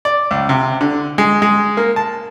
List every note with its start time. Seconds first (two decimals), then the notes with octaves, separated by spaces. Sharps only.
0.05 D5
0.31 C#2
0.49 C3
0.81 D3
1.18 G#3
1.42 G#3
1.77 A#3
1.96 A5